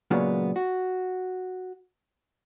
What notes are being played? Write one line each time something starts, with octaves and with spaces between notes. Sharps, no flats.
A#2 C#3 F#3 G#3 A#3 B3
F#4